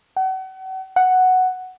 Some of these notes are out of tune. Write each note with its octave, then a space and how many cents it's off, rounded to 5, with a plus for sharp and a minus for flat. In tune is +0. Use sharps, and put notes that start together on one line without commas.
F#5 +40
F#5 +0